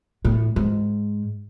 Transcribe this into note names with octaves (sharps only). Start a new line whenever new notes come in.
A2
G#2